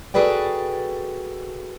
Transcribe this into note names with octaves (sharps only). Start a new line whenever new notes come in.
F#4 G#4 A4 B4 D5 G5